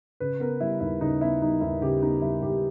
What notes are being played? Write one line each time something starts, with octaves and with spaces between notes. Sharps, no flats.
C#3 B4
B3 A#4
G3 E4
D#2 E4
C#3 D#4
B3 E4
G3 D#4
D#2 E4
C#3 G4
B3 D#4
G3 E4
D#2 G4